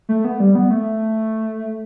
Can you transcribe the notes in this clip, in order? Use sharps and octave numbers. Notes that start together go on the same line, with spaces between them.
A3
B3
G3
B3
A3